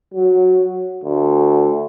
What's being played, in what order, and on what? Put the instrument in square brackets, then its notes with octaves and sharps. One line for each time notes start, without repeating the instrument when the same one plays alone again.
[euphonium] F#3
D2